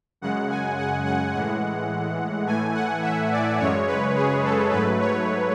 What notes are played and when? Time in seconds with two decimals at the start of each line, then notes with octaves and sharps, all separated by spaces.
0.21 F#2 C#3 G#3 F#5
0.50 G#5
0.78 F#5
1.06 F#5
1.34 A2 E3 G#3 F#5
2.47 A2 E3 A3 G#5
2.74 F#5
3.03 E5
3.32 D5
3.59 F#2 C#3 G#3 C#5
3.87 B4
4.16 G#4
4.44 A4
4.72 G#2 F#3 A3 B4
5.00 C#5